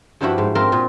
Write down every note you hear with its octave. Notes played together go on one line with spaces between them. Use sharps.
G2 F3 D4 E4 F#4 B5
G#2
C4 F4 A#4 E5 G5
A#2